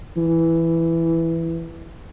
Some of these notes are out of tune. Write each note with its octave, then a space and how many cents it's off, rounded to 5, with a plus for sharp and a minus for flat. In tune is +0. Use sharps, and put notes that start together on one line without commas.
E3 +5